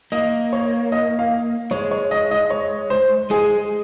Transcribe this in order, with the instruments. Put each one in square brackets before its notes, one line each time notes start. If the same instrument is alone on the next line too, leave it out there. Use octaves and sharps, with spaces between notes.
[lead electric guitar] A#3 [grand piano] D#5
[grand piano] C#5
D#5
F5
[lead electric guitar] G#3 [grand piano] C#5
[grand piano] C#5
D#5
D#5
C#5
C5
[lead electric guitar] G#3 [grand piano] G#4